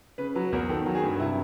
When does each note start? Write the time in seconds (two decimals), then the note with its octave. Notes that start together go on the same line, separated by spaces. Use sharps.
0.18 C#3 B4
0.35 F#3 B4
0.52 E2 A#4
0.69 D#3 A4
0.86 F#3
0.95 G#4
1.03 G2
1.20 C3 E4